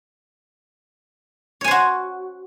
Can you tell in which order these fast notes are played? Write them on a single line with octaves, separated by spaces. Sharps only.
C#5 G#5 C5 F#4